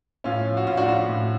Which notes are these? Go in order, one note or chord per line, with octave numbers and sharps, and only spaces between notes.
A2 C#4 F4
F3
F#4
A2 F4
D4 F#4
F4
F3 D4 F#4
A2